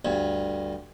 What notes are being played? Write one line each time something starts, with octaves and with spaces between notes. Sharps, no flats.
D2 G2